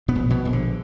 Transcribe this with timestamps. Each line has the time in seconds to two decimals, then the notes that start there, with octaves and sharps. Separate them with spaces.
0.08 B2 B3
0.15 A#1
0.30 B2 B3
0.45 A#1
0.53 D3